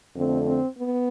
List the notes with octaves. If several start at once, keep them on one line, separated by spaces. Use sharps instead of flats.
F2 D3 A3 C4
C4
B3